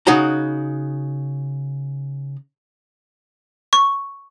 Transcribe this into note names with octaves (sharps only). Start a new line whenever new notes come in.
C#3 D#4 F#4 A#5
C#6